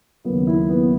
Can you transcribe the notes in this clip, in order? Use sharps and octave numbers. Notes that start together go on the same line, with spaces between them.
D#2 C#3 F#3 A#3 B3
E4
B3